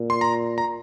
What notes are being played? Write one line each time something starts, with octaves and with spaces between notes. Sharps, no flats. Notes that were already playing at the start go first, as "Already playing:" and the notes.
Already playing: A#2
C6
A#5
A#5